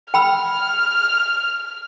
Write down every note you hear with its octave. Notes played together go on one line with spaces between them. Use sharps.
G5 B5 E6 F6